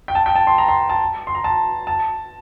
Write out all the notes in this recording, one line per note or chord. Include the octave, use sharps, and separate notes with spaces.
G5
A5
G5
A5
C6
A#5
C6
A5
C6
A#5
A5
A5